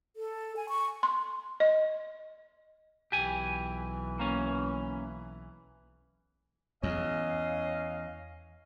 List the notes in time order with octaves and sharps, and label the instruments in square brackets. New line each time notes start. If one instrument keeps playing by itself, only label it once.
[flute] A4
G#5
C#6
[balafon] C6
D#5
[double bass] B1 E3 [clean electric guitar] G4 G#5
[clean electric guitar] A#3 C#4
[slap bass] E2 [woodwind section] C#4 D#5 F5